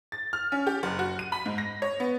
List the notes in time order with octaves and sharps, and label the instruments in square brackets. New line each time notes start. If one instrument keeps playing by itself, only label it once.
[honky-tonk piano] A6
F6
C#4
G4
F#1
F#4
D#7
B5
G#2
A#6
C#5
B3